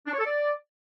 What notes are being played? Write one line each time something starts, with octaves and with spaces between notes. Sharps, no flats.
D4
C#5
A4
D5